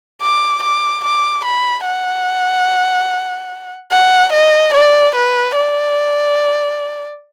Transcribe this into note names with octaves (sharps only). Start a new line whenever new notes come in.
D6
D6
D6
B5
F#5
F#5
D#5
D5
B4
D5